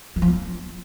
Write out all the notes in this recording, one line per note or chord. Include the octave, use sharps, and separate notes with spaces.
E3
F3
B3